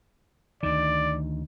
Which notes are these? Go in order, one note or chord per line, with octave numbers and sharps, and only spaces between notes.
D2 D#3 D5